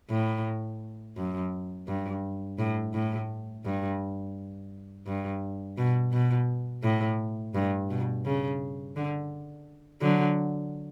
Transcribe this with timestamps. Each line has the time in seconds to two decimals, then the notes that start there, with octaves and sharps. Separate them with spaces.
0.10 A2
1.17 F#2
1.88 G2
2.59 A2
2.94 A2
3.65 G2
5.07 G2
5.78 B2
6.12 B2
6.83 A2
7.55 G2
7.90 B2
8.26 C#3
8.96 D3
10.01 D3 F#3